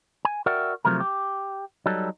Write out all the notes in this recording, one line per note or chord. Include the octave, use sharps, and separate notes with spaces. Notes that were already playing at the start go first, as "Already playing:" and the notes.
G#5
F#4 A#4 D5 E5 F#5 G5
C3 F3 F#3 A3 A#4
G4
F#3 G3 D#4 A4